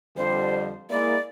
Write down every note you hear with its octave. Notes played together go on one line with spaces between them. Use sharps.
F2 D3 G3 C5
G#3 A#3 E4 D5